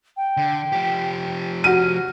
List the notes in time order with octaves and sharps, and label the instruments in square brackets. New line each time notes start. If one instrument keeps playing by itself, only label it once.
[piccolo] G5
[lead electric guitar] D3
F3 G4
[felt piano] F#4 D#7 [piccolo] F6